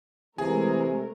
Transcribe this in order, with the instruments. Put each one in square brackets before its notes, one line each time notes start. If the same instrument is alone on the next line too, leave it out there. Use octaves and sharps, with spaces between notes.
[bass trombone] C3 [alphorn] E3 [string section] G#3 A3 A#4 [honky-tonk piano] G#4